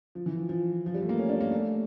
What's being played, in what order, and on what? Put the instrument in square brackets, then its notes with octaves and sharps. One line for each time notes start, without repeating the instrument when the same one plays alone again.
[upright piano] F3
E3
F3
F3
F3
G3
A3
A#3
C#4
D4
A#3
A3